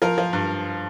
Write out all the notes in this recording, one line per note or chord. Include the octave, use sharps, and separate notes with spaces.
F3 A#4
F3
G2